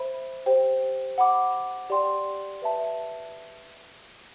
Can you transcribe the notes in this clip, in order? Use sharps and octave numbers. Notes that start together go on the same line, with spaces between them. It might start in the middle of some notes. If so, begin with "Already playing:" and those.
Already playing: C5 E5 B5
G4 C5 G5
F#5 B5 D6
G4 D5 G5 C6
B4 E5 A5